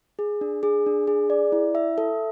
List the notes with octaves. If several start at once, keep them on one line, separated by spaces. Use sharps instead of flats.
G#4
D4
G#4
D4
G#4
D5
E4
E5
A4